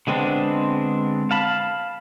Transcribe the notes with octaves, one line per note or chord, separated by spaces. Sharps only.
D3 G#3 B3 C4 D4
F5 A5 B5